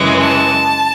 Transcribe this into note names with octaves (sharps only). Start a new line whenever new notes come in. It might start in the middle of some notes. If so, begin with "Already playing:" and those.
Already playing: F#2 C#3 E3 G#3
A5